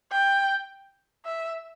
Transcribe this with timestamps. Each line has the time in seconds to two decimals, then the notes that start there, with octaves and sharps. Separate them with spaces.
0.12 G5
1.25 E5